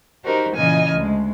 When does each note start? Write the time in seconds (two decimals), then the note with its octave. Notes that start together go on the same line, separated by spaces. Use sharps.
0.24 D#4 F#4 G4 A#4 C5
0.56 A#2 C#3 E3 D#5 G#5 F6
0.94 D2 G#3